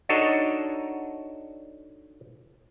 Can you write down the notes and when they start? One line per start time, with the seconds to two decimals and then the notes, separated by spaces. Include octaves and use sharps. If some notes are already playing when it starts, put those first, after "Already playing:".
0.09 D4 D#4 F#4 A4 C#5 D#5